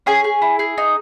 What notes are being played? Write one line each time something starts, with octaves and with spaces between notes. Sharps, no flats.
C#4 G#4 G#5
G#4
E4
G#4
D#4